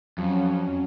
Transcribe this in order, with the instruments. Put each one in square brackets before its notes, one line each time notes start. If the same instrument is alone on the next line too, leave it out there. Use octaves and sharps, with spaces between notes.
[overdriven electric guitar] F2 [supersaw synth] F#3 C#4